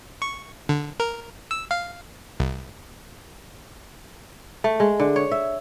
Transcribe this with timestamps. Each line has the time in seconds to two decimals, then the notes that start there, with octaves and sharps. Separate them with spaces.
0.22 C#6
0.69 D3
1.00 A#4
1.51 E6
1.71 F5
2.40 C2
4.64 A3
4.80 G#3
5.00 D3
5.16 C#5
5.31 E5